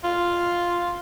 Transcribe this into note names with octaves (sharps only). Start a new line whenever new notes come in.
F4